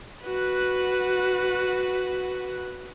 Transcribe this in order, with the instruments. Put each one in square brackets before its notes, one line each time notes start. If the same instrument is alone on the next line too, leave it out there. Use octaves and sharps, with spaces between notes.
[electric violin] F#4 B4